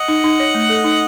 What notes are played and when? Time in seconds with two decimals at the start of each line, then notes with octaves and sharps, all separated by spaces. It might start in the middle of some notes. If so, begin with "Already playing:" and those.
Already playing: D#5 F#5
0.08 D#4
0.24 D#4
0.40 C#5
0.55 A3
0.69 A4
0.84 D#4